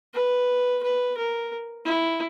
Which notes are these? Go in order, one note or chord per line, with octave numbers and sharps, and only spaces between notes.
B4
B4
A#4
E4